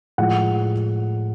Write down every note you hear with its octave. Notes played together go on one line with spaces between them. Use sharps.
A2 F3 G#3 F#5